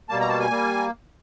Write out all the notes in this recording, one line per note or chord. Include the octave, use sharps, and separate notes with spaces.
B2 G3 A#3 A5
A#5
A5
G#5
G3 A#3